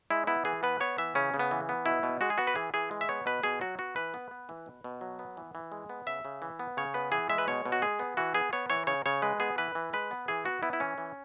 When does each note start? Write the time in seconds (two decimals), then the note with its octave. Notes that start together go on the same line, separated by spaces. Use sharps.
0.11 G#3 E4
0.27 B3 E4
0.45 E3 G#4
0.63 B3 B4
0.80 B3 C#5
0.98 E3 E5
1.15 C#3 C#4
1.34 C#3
1.39 B3
1.51 E3
1.69 B3
1.86 B2 E4
2.03 B2
2.21 G#3 F#4
2.30 G#4
2.38 B3 F#4
2.47 B4
2.55 E3 G#4
2.74 E3 G#4
2.91 G#3
3.01 E5
3.09 B3 C#5
3.26 B2 B4
3.43 B2 G#4
3.61 F#3 F#4
3.78 B3 F#4
3.96 E3 B4
4.14 B3
4.31 B3
4.49 E3
4.66 B2
4.84 B2
5.01 F#3
5.19 B3
5.37 E3
5.55 E3
5.72 G#3
5.90 B3
6.06 C#3 E5
6.25 C#3
6.42 E3
6.59 B3
6.77 C#3 C#5
6.94 B3 B4
7.12 E3 G#4
7.30 G#3 E5
7.38 B4
7.48 B2 C#5
7.66 B2
7.72 F#4
7.82 G#3 G#4
7.99 B3
8.17 E3 F#4
8.35 B3 G#4
8.53 B3 C#5
8.70 E3 C#5
8.87 C#3 C#5
9.06 C#3 C#5
9.22 G#3 B4
9.40 B3 G#4
9.58 E3 B4
9.75 E3
9.93 G#3 B4
10.11 B3
10.28 E3 G#4
10.45 B3 F#4
10.63 B3 E4
10.73 E4
10.80 E3 C#4
10.98 E3